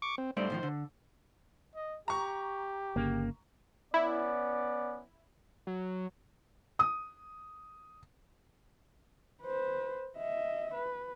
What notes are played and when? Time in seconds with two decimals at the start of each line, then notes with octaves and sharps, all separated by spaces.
0.02 C#6 D6
0.18 C4
0.37 G2 A3 C5 D5
0.50 A2 D#3 F3
0.63 D3
1.75 D#5
2.08 G4 A#5 C#6
2.96 G1 C#3 A#3
3.94 B3 C#4 E4 D5
5.67 F#3
6.79 D#6
9.42 B4 C5
10.18 D#5 E5
10.73 B4